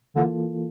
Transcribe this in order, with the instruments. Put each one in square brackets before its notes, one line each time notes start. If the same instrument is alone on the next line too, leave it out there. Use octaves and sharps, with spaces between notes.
[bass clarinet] D3 [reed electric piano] E3 A#3 F4 A4